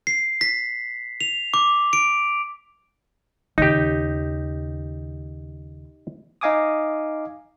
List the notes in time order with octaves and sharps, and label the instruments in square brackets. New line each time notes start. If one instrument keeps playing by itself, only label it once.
[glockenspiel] C7
B6
F7
D6
D7
[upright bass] D#2 C#3 [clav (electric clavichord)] D#4 G4
[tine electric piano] D#4 D#5 F5 G#5 D6 D#6